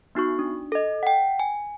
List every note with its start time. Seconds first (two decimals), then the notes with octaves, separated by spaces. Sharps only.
0.15 B3 D#4 F#4 C#6
0.39 D4
0.72 A4 D#5
1.03 F#5 G5
1.40 G#5